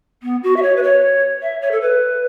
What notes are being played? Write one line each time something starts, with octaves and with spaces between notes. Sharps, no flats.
B3
F#4
E5
C#5
B4
C#5
E5
C#5
A4
B4